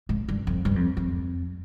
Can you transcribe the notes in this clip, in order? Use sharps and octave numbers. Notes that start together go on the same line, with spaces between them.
G#2
G2
F2
G2
F2
F2